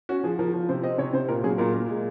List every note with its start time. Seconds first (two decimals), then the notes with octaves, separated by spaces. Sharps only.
0.09 C#4 F#4
0.24 F3 G#4
0.39 F3 A#4
0.54 F3
0.69 C3 C5
0.83 C4 D#5
0.98 C3 C#5
1.13 C3 C5
1.28 A#2 A#4
1.44 F#3 G#4
1.58 A#2 A#4
1.74 A#2
1.88 G#3